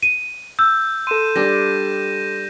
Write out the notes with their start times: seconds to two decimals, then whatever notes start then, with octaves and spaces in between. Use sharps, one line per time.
0.03 D#7
0.59 E6 G6
1.07 A4 C6 D#7 E7
1.36 G3 D4 A#6